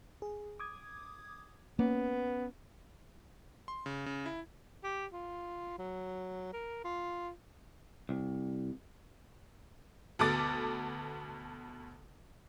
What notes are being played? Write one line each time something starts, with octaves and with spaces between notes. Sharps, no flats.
G#4
D6 D#6 G#6
A#3 B3 C#4
C6
C#3
C#3
E4
G4
F4
F#3
A#4
F4
C2
D2 B2 B3 A4 D6 A6